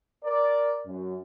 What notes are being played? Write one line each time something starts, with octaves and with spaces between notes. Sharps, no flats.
A#4 D5
F#2